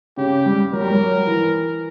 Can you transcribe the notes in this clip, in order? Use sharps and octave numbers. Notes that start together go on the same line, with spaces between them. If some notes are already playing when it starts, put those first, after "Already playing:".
C#3 G4
G3
F#3 A#4
G3
F#3
E3